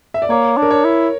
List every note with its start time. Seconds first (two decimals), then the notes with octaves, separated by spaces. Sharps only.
0.14 E5
0.22 D5
0.30 A#3 C#5
0.57 D4
0.62 A#4
0.71 C#5
0.85 E4